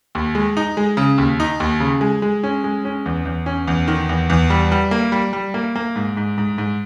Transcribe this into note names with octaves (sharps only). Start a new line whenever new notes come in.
D#2
G#3
D#4
G#3
C#3
D#2
D#4
D#2
C#3
G#3
G#3
C#4
G#3
C#4
E2
E2
C#4
E2
D#3
E2
E2
G3
G3
A#3
G3
G3
A#3
A#3
G#2
G#2
G#2
G#2